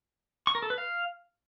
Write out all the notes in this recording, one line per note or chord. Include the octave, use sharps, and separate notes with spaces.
C#6
A#4
A4
B4
F5